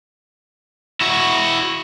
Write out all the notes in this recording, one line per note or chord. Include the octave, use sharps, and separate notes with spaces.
E4 F#4